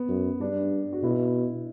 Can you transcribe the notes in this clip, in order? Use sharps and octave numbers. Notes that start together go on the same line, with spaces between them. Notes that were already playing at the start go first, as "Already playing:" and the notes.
Already playing: B3
F#2
G2 D4
F#4
B2 E4